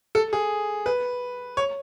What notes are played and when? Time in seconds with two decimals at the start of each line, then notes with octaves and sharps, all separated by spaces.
0.15 A4
0.33 G#4
0.86 B4
1.57 C#5